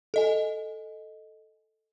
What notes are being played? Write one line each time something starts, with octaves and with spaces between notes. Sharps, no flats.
A4 D#5 G#5